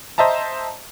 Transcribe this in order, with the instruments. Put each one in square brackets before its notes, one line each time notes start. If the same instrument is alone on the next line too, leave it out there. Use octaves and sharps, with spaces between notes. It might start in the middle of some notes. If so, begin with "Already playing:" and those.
[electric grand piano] C5 D#5 E5 A5 A#5